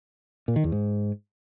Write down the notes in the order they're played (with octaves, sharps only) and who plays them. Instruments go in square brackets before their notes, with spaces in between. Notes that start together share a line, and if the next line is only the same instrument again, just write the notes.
[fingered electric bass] A#2
D#3
E2
G#2